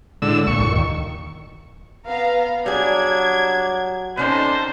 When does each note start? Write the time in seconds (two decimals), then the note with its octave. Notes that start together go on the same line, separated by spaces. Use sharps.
0.22 A2 D3 G#3 E6
0.47 C2 A#2 C#6
0.61 G2
0.72 D#2 D#3
2.06 B3 F5 A#5
2.66 F#3 G3 D4 G#4 G#6
4.17 C3 C#4 D#4 A4 C5 D5 A5